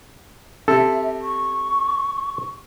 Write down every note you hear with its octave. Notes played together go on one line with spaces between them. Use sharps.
C3 A4 E5
C#6